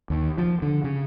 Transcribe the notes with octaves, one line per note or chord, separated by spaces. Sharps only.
D#2
F3
D3
C#3